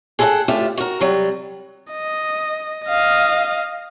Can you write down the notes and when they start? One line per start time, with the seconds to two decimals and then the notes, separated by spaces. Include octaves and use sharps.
0.19 G#4 A4 B4 E5 F#5 G5
0.48 D2 A2 F4 G4 E5
0.78 F#4 A#4
1.01 C3 F#3 G3
1.93 D#5
2.86 D#5 F5